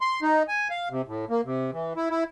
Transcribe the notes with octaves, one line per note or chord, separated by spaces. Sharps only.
C6
D#4
G#5
F5
C3
A2
A#3
C3
E3
E4
E4